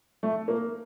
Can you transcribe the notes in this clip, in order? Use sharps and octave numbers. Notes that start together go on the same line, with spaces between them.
A3
A#3